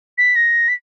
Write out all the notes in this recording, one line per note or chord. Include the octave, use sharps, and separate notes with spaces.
B6
A#6
B6